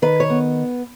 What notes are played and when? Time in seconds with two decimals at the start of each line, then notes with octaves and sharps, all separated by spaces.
0.02 D#3 B4
0.20 C#5
0.30 B3